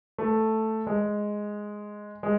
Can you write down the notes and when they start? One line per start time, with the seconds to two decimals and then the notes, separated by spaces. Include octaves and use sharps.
0.18 A3
0.87 G#3
2.23 G#3